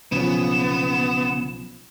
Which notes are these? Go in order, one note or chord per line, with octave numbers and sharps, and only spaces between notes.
B1 C#3 F3 B3 E7